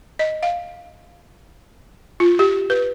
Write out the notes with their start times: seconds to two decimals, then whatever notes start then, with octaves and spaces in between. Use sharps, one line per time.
0.19 D#5
0.43 F5
2.20 F4
2.39 G4
2.70 B4